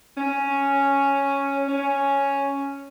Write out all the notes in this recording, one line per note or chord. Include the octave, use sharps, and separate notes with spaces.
C#4
C#4